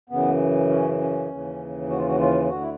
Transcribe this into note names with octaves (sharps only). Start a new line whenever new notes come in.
F#2 C#3 E3 B3
C#4
C#4
D#2 C#3 E3
F#4
F4
F#4
F4
D2 D3 F#4
E4